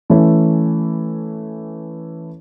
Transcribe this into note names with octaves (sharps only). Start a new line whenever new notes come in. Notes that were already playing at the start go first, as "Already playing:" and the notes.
E3 A3 C#4 E4 A4